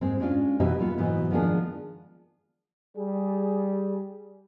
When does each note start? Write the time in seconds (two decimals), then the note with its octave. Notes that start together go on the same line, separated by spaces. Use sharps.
0.01 G#2 G#3 C4
0.20 G#3 C#4 D4 F4
0.60 B2 E3 D#4 G4 E5
0.79 F#3 B3 F4
0.98 G#2 B2 E3 F#3 B3
1.31 D#3 F3 G#3 B3 D4 G#4
2.96 G3 G#4